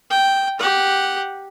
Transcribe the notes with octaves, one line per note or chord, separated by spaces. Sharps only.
G5
G4 F#5